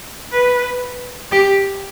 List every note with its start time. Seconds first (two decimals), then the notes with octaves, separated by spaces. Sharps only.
0.32 B4
1.32 G4